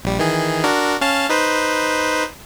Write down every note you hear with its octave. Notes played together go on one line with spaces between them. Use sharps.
A#1 G3
D#3 E3 G#4
D4 F#4 A#4
C#4 F5 A5
D#4 B4 C5